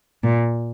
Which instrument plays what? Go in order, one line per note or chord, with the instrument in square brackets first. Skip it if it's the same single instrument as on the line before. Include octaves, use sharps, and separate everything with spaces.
[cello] A#2